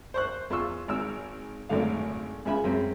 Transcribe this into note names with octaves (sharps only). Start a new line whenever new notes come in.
C5 C#6 F#6
E2 F4 C6 C#6 E6
G#1 E6
G#1 F#2 A2 D3 F5
C#2 C#3 E5 G#5 B5
F#2 G#3 C4 C#4